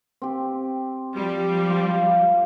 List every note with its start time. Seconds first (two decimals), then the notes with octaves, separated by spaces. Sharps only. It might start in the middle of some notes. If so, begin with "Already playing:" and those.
0.22 C4 G4
1.16 F3 G3
1.70 F4 F5